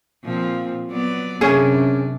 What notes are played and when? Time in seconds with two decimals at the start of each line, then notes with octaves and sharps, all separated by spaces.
0.24 A#2 F3 C4
0.88 F#3 B3 D5
1.41 F#2 C3 C#4 D4 G#4